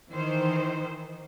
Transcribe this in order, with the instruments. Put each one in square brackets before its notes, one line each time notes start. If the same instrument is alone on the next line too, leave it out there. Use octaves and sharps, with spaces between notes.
[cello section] D#3 E3 C5